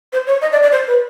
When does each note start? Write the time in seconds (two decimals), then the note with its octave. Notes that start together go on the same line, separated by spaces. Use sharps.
0.13 C5
0.26 C#5
0.41 D#5
0.52 D5
0.62 D5
0.72 C5
0.87 B4